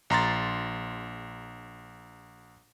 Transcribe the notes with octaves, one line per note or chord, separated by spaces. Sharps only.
A#1 A#5 C6 A6